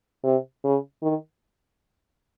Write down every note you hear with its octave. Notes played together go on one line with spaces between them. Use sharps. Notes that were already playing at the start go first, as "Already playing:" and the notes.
C3
C#3
D#3